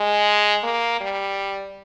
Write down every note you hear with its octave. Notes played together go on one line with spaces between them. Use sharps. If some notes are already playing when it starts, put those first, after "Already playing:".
Already playing: G#3
A#3
G3